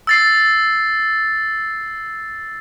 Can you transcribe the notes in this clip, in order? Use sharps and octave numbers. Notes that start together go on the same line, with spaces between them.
E6 A6 C7